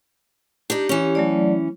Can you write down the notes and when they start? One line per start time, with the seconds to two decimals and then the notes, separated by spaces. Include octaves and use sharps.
0.70 D4 D#4 G4
0.89 E3 C#4
1.15 F#3 A3 D5